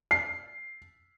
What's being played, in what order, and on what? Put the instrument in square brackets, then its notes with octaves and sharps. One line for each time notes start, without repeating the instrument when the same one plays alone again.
[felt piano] C7